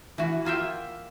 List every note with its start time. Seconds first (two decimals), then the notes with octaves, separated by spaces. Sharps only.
0.18 E3 F#4
0.45 A#3 F4 E5 G5